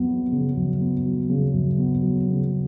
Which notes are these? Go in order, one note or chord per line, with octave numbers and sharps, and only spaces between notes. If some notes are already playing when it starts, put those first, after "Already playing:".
Already playing: F#2 B3
F#3
C#3
F#2
B3
F#3
C#3
F#2
B3
F#3
C#3